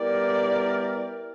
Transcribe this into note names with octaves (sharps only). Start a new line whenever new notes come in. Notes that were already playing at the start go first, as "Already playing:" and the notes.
Already playing: G3 B3 E4 G4 A#4 D5